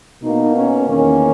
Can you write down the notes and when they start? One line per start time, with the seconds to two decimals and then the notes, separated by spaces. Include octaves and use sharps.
0.23 B2 A#3 D#4
0.55 C#4
0.86 E2 D#3 A#3 C#4